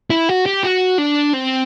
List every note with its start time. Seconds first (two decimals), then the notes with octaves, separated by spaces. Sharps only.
0.10 E4
0.29 F#4
0.46 G4
0.63 F#4
0.99 D4
1.34 C4